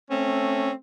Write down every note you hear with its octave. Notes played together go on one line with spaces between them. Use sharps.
A3 C4 C#4